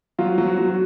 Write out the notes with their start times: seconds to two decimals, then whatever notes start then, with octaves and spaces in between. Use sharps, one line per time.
0.19 F#3 F4
0.38 F#3
0.48 F#4
0.57 F#3
0.68 F#4